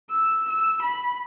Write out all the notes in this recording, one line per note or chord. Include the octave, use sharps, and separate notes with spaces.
E6
E6
B5